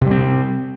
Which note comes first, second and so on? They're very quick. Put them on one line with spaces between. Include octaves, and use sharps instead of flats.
C3 G3 C4